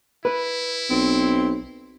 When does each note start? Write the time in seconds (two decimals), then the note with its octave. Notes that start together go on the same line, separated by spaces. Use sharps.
0.25 E4 B4
0.90 B1 C4